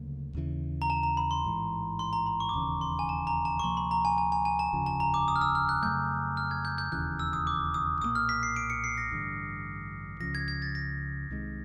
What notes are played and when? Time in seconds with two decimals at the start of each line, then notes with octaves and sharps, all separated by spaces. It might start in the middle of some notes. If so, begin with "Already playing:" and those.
Already playing: D2 C#3 F#3 A#3
0.34 D#2 C#3 E3
0.82 A#5
0.90 A5
1.03 A#5
1.17 B5
1.31 C6
1.45 A1 G#2 E3
1.99 C6
2.13 A#5
2.26 B5
2.40 C#6
2.49 D6
2.53 E1 D#2 C#3 E3 C#6
2.81 C6
2.99 G#5
3.09 A5
3.27 A#5
3.45 A5
3.59 C#6
3.64 D2 C3 F3 A#3 C6
3.77 B5
3.91 A#5
4.05 G#5
4.18 G#5
4.32 G#5
4.45 G#5
4.59 A5
4.73 F1 D#2 C#3 F3
4.86 A5
5.00 A#5
5.14 D6
5.28 D#6
5.36 F6
5.41 E6
5.55 F6
5.69 F#6
5.83 F2 C#3 F#3 A3 G6
6.37 F6
6.51 G#6
6.65 G6
6.78 G6
6.92 E1 D#2 C#3 E3 F#6
7.19 E6
7.33 D#6
7.47 D6
7.74 D#6
8.01 B1 A#2 F3 A#3 D#6
8.15 F6
8.29 B6
8.43 C7
8.56 D7
8.70 C#7
8.84 C7
8.98 A#6
9.11 A1 G2 D3
10.20 C#2 C#3 F3 A#6
10.35 G#6
10.48 G#6
10.62 A6
10.75 A#6
11.30 C2 C3 D#3 G#3